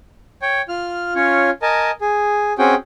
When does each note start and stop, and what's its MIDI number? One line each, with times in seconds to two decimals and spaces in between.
0.42 0.62 73
0.42 0.62 79
0.69 1.14 65
0.69 1.14 89
1.15 1.50 61
1.15 1.50 65
1.15 1.50 73
1.62 1.91 70
1.62 1.91 75
1.62 1.91 80
1.62 1.91 81
2.01 2.53 68
2.58 2.75 60
2.58 2.75 61
2.58 2.75 66
2.58 2.75 68
2.58 2.75 79